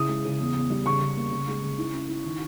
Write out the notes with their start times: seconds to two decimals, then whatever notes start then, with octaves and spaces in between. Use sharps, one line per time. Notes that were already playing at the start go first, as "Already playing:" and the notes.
Already playing: C#3 E4 D#6
0.09 G#3
0.25 C#3
0.40 E2
0.55 E2
0.70 G3
0.86 C#3 C#6
1.02 C#3
1.17 A#3
1.31 C#3
1.47 G#3
1.63 C#3
1.78 E4
1.94 C#4
2.09 E4
2.24 D#3